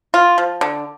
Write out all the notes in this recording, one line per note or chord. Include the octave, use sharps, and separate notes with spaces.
F4
F3
D3